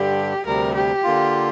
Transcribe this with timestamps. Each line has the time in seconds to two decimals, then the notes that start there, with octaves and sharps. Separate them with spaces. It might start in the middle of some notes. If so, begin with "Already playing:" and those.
Already playing: G2 D3 G3 G4
0.46 D2 C3 G3 A#4
0.74 G4
1.03 D3 A#3 F4